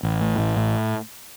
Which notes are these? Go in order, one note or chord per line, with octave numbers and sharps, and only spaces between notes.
A1
A2
A1
A2